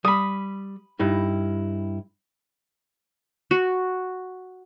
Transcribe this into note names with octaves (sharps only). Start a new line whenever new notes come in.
G3 B5 D#6
G2 D#4 E4
F#4